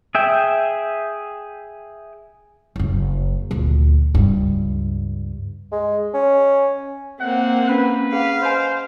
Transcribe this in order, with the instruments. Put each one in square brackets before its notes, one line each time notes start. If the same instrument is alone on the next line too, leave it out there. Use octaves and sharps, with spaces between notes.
[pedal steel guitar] G#4 E5 G5
[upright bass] F#1 F#2
D2 A#2
C#2 G2
[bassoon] G#3
C#4
[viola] A#3 C4 [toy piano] E5 [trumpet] F#5
[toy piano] C#4 [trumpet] B4
[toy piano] G#4 F#5 [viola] F5
[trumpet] C5 [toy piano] D#5 G#5